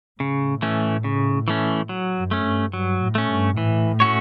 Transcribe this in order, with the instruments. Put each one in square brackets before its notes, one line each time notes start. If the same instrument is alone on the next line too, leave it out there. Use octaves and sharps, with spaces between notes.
[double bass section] A2 [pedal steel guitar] C#3
[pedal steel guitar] E3 A3 C#4
C#3
E3 A3 C#4
F#3
[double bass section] F#2
[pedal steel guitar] A3 C#4
[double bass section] G2
[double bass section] G2 [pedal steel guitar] F#3
[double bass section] A2
[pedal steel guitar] A3 C#4
[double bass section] G2
[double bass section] A2 [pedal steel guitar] E3
[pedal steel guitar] A3 C#4 F#4 C#5